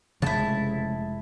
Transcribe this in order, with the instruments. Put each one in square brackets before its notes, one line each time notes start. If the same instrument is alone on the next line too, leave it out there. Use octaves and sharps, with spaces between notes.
[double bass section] F1 G#3 [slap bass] C#3 F3 A3 [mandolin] E4 A5